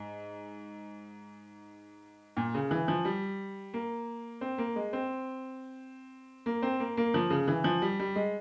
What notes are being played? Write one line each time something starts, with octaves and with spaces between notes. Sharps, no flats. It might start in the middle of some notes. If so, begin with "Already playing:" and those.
Already playing: G#2
A#2
C#3
E3
F3
G3
A#3
C4
A#3
G#3
C4
A#3
C4
A#3
A#3
F3
C#3
E3
F3
G3
G3
G#3